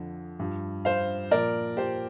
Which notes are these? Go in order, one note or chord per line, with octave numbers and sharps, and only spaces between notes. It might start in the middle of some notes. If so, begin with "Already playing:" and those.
Already playing: F2 D3 F3
G2 F3
C5 F5
A#2 F3 A#4 D5
G4 C5